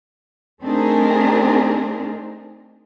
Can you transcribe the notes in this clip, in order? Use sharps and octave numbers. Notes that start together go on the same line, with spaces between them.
A3 C4 D4 D#4 G#4 A#4